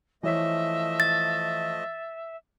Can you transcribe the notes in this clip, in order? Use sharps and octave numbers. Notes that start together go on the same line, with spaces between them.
E3 F3 A3 C#5 D#5 E5 B6
A6